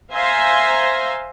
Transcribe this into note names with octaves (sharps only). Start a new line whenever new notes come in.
C5 E5 F5 G#5 A#5 C6